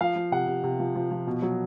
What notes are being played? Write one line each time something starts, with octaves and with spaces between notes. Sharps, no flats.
F3 F5
F3
C3 F#5
C3
C3
F3
F3
F3
B2
F#3